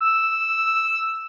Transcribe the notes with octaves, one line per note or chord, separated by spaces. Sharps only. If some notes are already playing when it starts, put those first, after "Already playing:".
E6